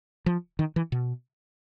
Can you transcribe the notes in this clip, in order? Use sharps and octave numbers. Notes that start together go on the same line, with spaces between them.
F3
D#3
E3
B2